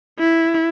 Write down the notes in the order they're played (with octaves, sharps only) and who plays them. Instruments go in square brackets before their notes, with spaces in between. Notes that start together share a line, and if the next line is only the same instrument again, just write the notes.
[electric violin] E4